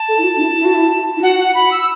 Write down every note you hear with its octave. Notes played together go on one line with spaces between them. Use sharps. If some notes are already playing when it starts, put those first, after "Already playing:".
Already playing: A5
A4
E4
F#4
D4
E4
E4
F#4
E4
E4
F#4 F#5
F#5
B5
E6